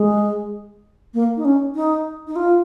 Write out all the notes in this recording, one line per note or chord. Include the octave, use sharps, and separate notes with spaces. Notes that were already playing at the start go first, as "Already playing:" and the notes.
Already playing: G#3
A#3
D#4
C#4
D#4
D#4
F4